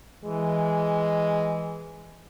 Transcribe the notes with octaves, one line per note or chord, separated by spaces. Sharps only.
E3 G#3